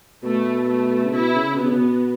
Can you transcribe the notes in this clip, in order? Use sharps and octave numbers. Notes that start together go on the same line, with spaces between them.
B2 A3
A3
C#3
B2 E4
C#3
B2 B3
C#3
B2